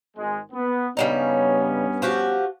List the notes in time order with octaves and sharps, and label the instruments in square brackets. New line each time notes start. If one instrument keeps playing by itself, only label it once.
[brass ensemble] G#1 G#3
B3
[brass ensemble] G2 B3 C#4 [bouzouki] C#3 G3 D#4
[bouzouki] F3 F#4 G4